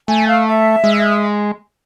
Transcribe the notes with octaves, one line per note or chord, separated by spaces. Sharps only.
A3 G#5
F5
E5
G#3